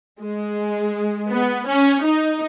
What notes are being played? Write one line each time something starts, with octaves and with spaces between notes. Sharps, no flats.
G#3
B3
C#4
D#4